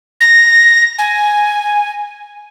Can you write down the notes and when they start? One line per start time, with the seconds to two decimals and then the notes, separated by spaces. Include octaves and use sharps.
0.21 A#6
0.98 G#5